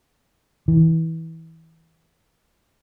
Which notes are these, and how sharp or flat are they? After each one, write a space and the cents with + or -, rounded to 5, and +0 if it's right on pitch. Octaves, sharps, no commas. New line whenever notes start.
E3 -25